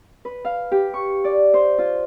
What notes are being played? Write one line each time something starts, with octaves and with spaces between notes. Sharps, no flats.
B4
F5
G4
C#6
D5
C5
F4